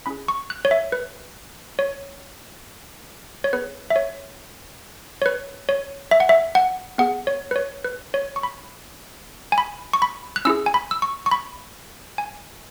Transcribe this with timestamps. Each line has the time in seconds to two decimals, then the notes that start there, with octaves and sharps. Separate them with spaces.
0.06 C#4 E4 G#4 B5
0.28 C#6
0.50 F#6
0.65 C#5
0.71 E5
0.92 B4
1.79 C#5
3.44 C#5
3.53 B3 G#4 B4
3.90 E5
3.96 C#5
5.22 C#5
5.26 B4
5.69 C#5
6.11 E5
6.20 F#5
6.29 E5
6.55 F#5
6.98 B3 G#4 F#5
7.27 C#5
7.51 B4
7.56 C#5
7.84 B4
8.14 C#5
8.36 C#6
8.43 B5
9.52 G#5
9.58 B5
9.93 C#6
10.02 B5
10.36 F#6
10.45 C#4 E4 G#4 E6
10.66 G#5
10.74 B5
10.91 E6
11.02 C#6
11.26 C#6
11.31 B5
12.18 G#5